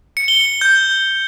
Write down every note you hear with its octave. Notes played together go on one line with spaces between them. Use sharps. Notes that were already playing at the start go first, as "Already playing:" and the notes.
C#7
G7
G6